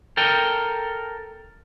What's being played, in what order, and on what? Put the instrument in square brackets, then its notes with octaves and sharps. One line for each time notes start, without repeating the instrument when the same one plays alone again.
[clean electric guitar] A4 A#4 G5